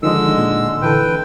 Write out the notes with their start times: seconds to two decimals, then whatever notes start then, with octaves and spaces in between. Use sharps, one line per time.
0.03 D3 D#3 F3 G#3 D#5 E6
0.39 A#2
0.82 D3 E3 A4 B4 G5